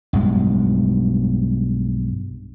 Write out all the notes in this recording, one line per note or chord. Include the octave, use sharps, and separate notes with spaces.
B1 G2 G#3